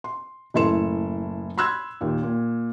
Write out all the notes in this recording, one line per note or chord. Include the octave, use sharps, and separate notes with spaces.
C6
F#1 A2 E4 A4 C6 E7
B5 C6 E6 F#6 G#6
D#2 A#2
A#2